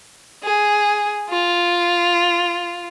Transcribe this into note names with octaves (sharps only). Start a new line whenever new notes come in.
G#4
F4